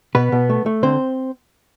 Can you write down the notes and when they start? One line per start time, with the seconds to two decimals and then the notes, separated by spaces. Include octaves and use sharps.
0.15 B2 B3 B4
0.32 B2
0.49 A3
0.66 A3
0.83 D3 C4 C5